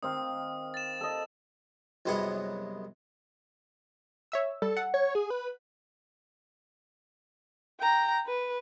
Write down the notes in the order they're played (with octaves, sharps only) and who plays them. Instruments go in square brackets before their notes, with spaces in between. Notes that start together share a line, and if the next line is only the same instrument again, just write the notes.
[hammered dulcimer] D#3 C4 F5 [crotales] D#6
[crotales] A6 E7
[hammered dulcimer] A4 D#5
[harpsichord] C2 F#2 G#3 B3 F#5 D#6
[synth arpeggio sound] C#5 E5 E6
[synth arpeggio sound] G3 [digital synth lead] A4
[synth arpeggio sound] F#5
[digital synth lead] C#5
G#4
B4
[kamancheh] G5 A#5
B4